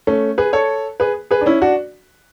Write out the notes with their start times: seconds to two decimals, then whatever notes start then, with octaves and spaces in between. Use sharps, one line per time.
0.07 A3 C#4
0.38 G#4 B4
0.53 A4 C#5
1.00 G#4 B4
1.31 G#4 B4
1.41 D4
1.46 C#4 E4
1.61 D4 F#4